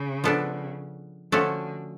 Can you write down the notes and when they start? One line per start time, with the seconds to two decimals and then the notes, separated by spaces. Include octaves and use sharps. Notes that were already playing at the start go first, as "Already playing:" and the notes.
Already playing: C#3
0.24 F3 B3 D4 F4 A4
1.32 D3 F3 A3 C#4 F#4 A4